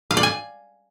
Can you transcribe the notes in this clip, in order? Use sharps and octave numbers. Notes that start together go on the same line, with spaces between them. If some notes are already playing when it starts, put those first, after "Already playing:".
F5
D5
G#5